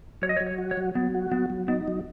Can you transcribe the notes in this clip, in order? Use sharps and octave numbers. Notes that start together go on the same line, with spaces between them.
F#3 C#5
D#5
C#5
F#3
C#5
F#4
C#5
F#3
F#3 B3
F#4
F#3 B3
F#3
B3 D#4
F#3